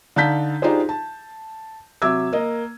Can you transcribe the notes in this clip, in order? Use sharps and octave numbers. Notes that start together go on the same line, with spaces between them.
D3 D#4 F5 A5 G6 B6
D4 D#4 F4 G4 G#4 C5
A5
C3 F#3 E5 D6 E6 G#6
A#3 D#5